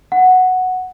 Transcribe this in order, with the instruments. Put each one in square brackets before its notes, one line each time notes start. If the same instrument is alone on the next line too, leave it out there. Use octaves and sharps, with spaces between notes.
[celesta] F#5